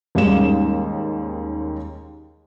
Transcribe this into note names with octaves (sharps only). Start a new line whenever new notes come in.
D#2 G#2 G3 G#3 C#4 E7